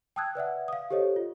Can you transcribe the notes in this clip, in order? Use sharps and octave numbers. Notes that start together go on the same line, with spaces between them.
G5 A5 D#6 E6 F#6 G#6
B4 D5 E5 F#5
F5 D#6
G4 A4 C5 C#5 D#5
F4